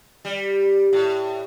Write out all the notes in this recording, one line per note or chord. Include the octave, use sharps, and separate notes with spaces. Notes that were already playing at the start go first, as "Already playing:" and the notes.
G3
A2